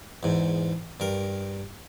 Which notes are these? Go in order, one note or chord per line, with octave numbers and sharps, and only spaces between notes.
E2 G#2
G2 A#4